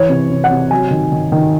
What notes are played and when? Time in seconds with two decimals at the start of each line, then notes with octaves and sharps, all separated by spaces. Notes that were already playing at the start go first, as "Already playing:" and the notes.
Already playing: E3 C#5
0.09 C3
0.30 C3
0.44 F#5
0.51 C3
0.71 F#3 G#5
0.91 D#3
1.12 D#3
1.32 D#3